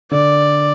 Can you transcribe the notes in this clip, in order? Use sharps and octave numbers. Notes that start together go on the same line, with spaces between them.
D3 D5